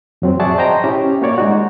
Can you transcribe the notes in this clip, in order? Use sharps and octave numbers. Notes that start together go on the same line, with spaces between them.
F2 F#3 C4
G#4 D5 E5 F#5 A5 C#6
C5 D#5 G5 A#5
C#4 E4 G4
A#3 F#4 C#5 D5
G#3 D#4 F#4